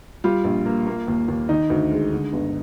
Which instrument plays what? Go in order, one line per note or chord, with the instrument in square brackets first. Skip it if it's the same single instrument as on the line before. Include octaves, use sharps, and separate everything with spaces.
[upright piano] G3 F4
A#1
A#3
A#3
D#2
D#2
D#3 D#4
D2
G#3
D3
G1